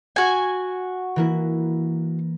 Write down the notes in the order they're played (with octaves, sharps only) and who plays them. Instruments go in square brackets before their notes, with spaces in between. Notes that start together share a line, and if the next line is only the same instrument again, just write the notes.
[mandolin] F#4 G#5
[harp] E3 A#3 E4